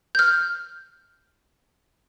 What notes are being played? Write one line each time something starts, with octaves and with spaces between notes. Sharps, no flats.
F6 G6